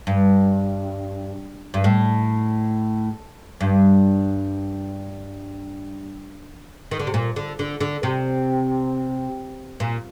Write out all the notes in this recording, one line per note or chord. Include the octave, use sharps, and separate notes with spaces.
G2
G2
A2
G2
D#3
D3
C3
A#2
D3
D3
D3
C3
A#2